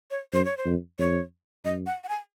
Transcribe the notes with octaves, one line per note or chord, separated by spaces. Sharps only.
C#5
F#2 C5
C#5
C5
F2
F2 C#5
F#2 D#5
F#5
F#5
G#5